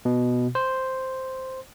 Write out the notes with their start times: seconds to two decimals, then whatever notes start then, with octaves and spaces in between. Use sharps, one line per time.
0.05 B2
0.55 C5